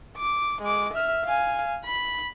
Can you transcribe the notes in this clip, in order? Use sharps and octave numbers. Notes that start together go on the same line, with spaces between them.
D6
G#3 D6
E5 F6
F5 G#5
B5